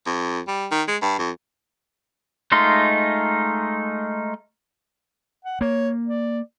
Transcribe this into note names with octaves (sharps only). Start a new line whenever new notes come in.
F2
G3
D#3
G#3
G2
F2
G#3 A3 D#4 F4 C6
F#5
A#3 C#5
D5